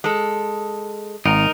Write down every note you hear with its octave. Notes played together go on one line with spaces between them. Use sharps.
G#3 A4
G#1 D#4 A#4